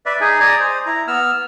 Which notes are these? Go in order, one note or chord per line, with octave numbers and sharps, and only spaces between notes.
B4 D5 E5
D#4 G#4 G#5
D5 G#5 A#5 D#6
C5
E4 A#5
B3 E6 F6